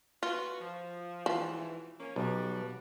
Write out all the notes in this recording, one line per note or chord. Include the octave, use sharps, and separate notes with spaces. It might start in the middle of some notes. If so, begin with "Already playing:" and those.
F4 F#4 B4
F3
G#2 B2 E3 F3
A#3 C#4
B1 G3 F#4